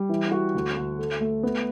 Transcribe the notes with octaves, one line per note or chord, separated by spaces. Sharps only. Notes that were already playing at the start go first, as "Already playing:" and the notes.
Already playing: G3
E3
F#4
D2
D2
A4
A3
B3